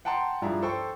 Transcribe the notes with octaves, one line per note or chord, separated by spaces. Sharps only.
F#5 G5 A5 A#5 C6
G2 F3 D4 E4 G#4 A#5
A4 C5 G5 C#6